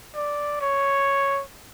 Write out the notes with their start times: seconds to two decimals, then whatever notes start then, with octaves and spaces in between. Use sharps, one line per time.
0.15 D5
0.60 C#5